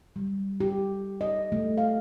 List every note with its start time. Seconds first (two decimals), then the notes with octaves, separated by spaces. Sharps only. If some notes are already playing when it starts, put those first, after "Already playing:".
0.16 G3
0.60 G4
1.21 D#5
1.52 A3
1.78 F5